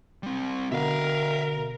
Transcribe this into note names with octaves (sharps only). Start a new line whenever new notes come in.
G3 C4
B2 D3 A#4 E5 F5